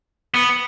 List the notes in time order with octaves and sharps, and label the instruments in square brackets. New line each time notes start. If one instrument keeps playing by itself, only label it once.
[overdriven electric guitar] B3